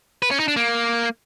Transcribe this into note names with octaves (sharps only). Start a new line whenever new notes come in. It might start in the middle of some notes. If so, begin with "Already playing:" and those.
B4
C#4
D#4
D4
A#3